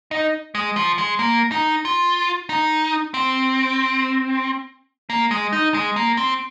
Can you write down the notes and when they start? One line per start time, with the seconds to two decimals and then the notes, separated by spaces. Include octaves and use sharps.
0.11 D#4
0.55 G#3
0.76 F3
0.98 G#3
1.19 A#3
1.52 D#4
1.85 F4
2.50 D#4
3.14 C4
5.10 A#3
5.31 G#3
5.53 D#4
5.74 G#3
5.96 A#3
6.17 C4